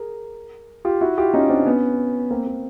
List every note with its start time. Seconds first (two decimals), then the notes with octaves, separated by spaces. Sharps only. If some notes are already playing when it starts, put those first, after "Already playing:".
Already playing: G#4 A#4
0.85 F4 G4
1.01 E4 F#4
1.18 F4 G4
1.34 C#4 D#4
1.50 C4 D4
1.66 B3 C#4
2.31 A#3 C4
2.47 A#3